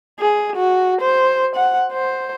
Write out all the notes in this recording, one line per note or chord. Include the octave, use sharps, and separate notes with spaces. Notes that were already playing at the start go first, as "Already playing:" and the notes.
G#4
F#4
C5
F#5
C5